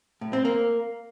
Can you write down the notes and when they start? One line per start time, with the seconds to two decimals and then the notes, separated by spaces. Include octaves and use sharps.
0.21 A2
0.33 C4
0.45 A#3